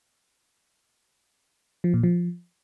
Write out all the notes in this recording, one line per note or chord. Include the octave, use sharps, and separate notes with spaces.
F3
A#2
F3